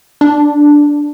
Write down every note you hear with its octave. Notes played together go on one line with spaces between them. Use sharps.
D4